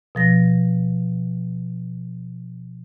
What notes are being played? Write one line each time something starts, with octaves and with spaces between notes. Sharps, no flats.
B2 F3 A#6